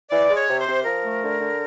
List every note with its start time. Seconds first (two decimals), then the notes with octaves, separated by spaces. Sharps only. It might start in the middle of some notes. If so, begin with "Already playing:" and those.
0.10 E3 D5
0.29 G#3
0.35 C#5
0.48 C3
0.60 C5
0.66 C3
0.84 F3 A#4
1.03 A3
1.21 D3
1.39 D3